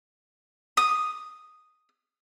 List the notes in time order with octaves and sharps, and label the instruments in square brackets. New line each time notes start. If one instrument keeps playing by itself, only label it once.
[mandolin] D#6